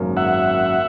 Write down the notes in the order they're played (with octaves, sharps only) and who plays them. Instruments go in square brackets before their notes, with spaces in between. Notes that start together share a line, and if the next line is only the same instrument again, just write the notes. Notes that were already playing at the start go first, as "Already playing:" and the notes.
Already playing: [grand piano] G#1 F#2 C#3 F#3 A#3
[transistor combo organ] E5 F#5